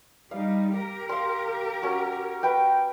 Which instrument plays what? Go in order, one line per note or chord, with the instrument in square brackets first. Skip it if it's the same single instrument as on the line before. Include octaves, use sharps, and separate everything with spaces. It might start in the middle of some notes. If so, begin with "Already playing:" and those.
[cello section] G3 D#4 [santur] F5
[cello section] G4 A#4
[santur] F5 C6
C#4 F#4
B4 E5 G5